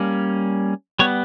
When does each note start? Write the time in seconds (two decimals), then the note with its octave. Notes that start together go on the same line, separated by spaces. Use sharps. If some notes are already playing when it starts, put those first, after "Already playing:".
Already playing: G3 A#3 C#4
0.99 G3 B3 C#5